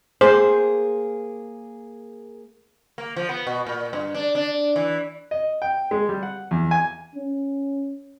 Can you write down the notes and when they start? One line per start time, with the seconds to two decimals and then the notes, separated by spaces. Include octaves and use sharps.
0.21 A#3 G#4 C5
2.98 A#3
3.17 F3
3.29 B3
3.47 B2
3.67 A#2
3.93 G2
4.15 D4
4.35 D4
4.76 E3
5.31 D#5
5.62 G5
5.91 G#3
6.09 G3
6.23 F#5
6.51 E2
6.71 G#5
7.15 C#4